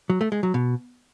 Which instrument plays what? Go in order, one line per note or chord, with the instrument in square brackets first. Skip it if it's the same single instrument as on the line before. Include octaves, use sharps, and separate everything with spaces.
[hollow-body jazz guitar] F#3
A3
G#3
F#3
B2